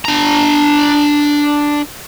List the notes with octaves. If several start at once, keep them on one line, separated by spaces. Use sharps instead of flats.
D4 A#5